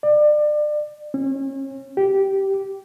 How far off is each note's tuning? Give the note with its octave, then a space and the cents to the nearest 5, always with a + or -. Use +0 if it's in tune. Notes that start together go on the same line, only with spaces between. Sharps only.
D5 +30
C#4 -35
G4 -10